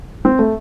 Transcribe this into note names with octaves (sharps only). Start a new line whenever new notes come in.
C4
A3